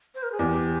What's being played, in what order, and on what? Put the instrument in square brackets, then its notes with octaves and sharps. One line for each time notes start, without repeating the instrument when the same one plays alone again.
[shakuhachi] C5
A#4
G#4
[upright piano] E2 [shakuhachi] G4